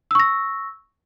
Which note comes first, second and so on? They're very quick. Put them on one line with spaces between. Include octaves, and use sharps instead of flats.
E6 C#6 A#6